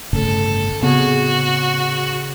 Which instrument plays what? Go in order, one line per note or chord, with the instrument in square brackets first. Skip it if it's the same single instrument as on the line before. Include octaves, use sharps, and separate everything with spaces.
[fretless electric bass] G1 A2 C#3 [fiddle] A4
[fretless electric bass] A2 B3 C4 [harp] C#3 G#4 [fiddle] F#4